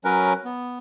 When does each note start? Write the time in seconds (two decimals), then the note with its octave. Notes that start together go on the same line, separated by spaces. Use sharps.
0.05 F#3 C#4 A#4 B4
0.45 B3